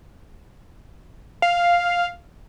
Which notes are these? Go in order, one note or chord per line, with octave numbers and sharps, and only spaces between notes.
F5